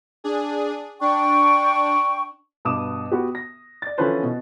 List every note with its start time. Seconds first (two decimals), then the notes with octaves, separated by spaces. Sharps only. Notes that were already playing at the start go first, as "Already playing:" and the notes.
0.24 D4 G#4
1.01 D4 G5 C#6
2.65 G2 B2 D6 D#6 E7
3.12 B3 F#4 G4
3.35 A#6
3.82 D5 A6
3.98 D3 E3 F3 C#4 B4 C5
4.23 B2